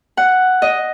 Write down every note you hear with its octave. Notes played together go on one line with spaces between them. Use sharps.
F#5
D#5